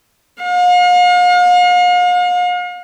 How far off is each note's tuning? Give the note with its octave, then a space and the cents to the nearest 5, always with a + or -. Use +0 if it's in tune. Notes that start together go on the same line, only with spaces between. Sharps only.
F5 +40